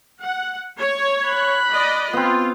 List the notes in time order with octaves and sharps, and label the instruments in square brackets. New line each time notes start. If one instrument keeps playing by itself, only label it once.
[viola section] F#5
C#5
[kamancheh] B5 F#6
[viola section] D5 D#5
[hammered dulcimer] B3 C4 [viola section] F4